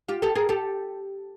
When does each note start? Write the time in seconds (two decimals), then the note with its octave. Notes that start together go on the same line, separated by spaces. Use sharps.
0.08 F4 G4
0.22 G4 A4
0.35 G#4 A#4
0.49 G4 A4